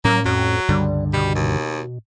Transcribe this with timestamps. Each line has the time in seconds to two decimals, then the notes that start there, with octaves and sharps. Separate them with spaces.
0.05 A2 F#3 A#3 C#4
0.25 F2 F#3
0.69 C#2 G2 D3 G3
1.13 B2 G3
1.35 D#2